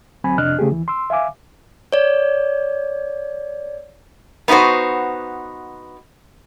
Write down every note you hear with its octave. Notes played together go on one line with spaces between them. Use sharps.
D2 F#3 C4 G#5 B5
F2 C3 D4 D#5 F6 F#6
C#3 A3 G4 G#4
D#2 E3
C6 E6
E5 F5 G#5 D6
C#5 D5
B3 D#4 E4 F#4 C5